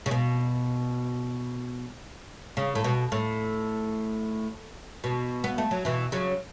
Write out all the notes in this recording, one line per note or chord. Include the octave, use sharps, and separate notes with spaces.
C#3
B2
C#3
A2
B2
A2
B2
B3
A3
F#3
B2 E3
C#3 F#3